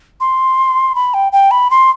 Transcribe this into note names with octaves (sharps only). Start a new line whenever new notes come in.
C6
B5
G5
G5
B5
C6